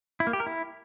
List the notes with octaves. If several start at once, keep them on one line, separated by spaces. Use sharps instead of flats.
E4
A#3
G4
A#4
E4